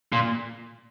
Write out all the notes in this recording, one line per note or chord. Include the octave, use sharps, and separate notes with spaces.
A#2